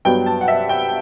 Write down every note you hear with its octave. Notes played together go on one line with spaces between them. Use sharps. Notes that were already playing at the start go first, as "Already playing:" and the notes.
G2 F#3 B3 G5
A5
F#5
E5
G5